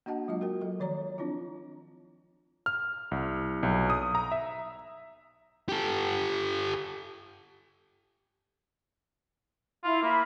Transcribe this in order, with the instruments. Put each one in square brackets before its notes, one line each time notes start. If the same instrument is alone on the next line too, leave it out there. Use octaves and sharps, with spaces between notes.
[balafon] A#3 D4 F#4 D#5 F#5 A5
F#3 G#3 F4 D#5
F#4 A#4 G5
F#3 A4 D#5
D#3 F3 C#5 D5 A#5
C4 D4 E4 F4
[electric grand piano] F6
C2
B1
D#6
A#5
E5
[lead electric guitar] G4 A4
[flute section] E4 F5 [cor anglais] F4
[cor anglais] A#3 [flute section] E5 B5